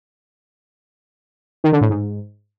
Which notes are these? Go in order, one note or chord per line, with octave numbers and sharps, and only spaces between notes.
D#3
D3
A2
G#2